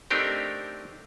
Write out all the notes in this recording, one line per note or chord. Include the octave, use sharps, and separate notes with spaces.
A3 C4 D4 D#4 G4 A#4